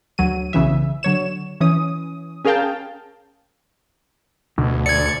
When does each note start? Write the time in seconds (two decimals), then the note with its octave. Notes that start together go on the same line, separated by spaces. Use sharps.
0.18 D2 F#3 D#7
0.53 B1 C#3 E3 E5
1.03 D3 F#3 C#5 E7
1.61 E3 C#4 D#6
2.45 C#4 G#4 A#4 F5 G5 A5
4.58 D2 B2
4.86 D5 G#6 C#7